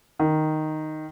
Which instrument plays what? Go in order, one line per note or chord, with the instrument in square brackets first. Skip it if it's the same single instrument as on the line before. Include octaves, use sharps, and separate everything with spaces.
[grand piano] D#3